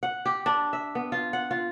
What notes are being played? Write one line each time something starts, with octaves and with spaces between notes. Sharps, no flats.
F#5
G4
D4
E5
B3
F4
F#5
F4